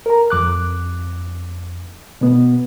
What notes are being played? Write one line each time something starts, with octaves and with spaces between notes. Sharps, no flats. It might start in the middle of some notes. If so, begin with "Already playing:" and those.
A#4 A#5
F2 D6 F#6
B2 B3